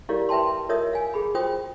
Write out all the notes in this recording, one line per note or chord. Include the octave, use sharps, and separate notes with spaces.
E4 G4 A#4 C#5 D5 F5
B4 E5 G5 A5 C6
F4 A#4 C#5 D#5 E5 D#6
F5 G#5
G#4 B5
F4 F#4 C5 G5 D#6